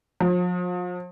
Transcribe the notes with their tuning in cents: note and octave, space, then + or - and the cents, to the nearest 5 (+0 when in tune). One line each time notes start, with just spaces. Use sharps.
F3 +40